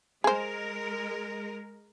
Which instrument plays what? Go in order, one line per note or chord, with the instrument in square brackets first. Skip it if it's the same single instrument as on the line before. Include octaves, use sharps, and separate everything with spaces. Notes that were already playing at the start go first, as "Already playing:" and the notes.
[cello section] G#3 A#4 [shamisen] G#4 C5